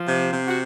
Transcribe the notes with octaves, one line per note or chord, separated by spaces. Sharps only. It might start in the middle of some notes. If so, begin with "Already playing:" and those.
Already playing: F3
C3
C3
F#4